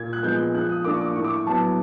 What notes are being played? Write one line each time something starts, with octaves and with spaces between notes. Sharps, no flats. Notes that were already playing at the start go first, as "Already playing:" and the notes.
Already playing: A#2 G#6
F#6
F3 G#3 B3 G6
F3 F#6
D#6
A#3 D4 D6
C#6
D6
A2 C#6
D6
C#6
F#3 B3 A5